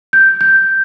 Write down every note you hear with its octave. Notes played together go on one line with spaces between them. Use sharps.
G6
G6